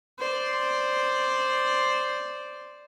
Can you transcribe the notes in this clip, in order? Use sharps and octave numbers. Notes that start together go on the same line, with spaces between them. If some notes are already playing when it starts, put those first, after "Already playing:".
C5 D5